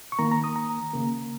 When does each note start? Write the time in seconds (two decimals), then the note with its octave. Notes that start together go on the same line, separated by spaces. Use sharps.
0.12 C#6
0.19 D#3 A#3 A#5
0.32 A#5
0.44 D#6
0.56 A#5
0.94 C#3 A#3